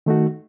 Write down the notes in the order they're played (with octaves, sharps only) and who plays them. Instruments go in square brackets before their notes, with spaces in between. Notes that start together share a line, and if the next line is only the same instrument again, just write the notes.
[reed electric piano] D#3 A3 D#4 F#4